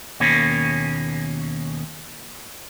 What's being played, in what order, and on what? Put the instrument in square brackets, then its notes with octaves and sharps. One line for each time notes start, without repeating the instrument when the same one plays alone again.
[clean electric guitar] D#2 B2 A#3 C#4